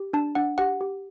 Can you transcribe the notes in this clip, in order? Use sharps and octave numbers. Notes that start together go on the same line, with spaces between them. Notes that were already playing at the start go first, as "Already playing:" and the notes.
Already playing: G4
D4 A5
D4 F#5
G4 F#5
G4